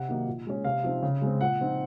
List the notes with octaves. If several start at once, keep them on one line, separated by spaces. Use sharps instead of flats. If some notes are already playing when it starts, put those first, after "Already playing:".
Already playing: C3 F#5
D#3 F#3 A#3 D#4
A#2
G#3 C#4
C3 F5
F3 C4 D#4
C#3
G#3 C4
A#2 F#5
F3 C4 D#4